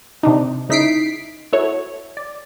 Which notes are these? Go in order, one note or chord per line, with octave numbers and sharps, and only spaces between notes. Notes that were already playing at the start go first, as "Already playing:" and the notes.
C3 D4 D#4
C#3 D#4 E4 B6 C7 D7
E4 F#4 A4 C#5
D5